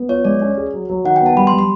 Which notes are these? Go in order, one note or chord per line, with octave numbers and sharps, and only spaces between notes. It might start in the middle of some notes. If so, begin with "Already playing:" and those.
Already playing: B3
F4 C#5
G#3 D5
C#4
G#4
F#3
F#3
D#3 F#5
G5
B3
A5
G3 B5
C6
G3
C6